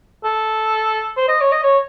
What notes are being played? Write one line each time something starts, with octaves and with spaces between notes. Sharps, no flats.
A4
C5
D#5
C#5
D#5
C#5